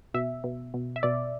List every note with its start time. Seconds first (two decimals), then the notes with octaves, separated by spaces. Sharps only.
0.14 B2 E5
0.44 B2
0.74 B2
0.96 E5
1.03 B2 D5